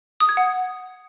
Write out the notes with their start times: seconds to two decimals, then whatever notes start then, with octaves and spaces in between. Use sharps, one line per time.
0.20 D#6
0.29 G#6
0.37 F#5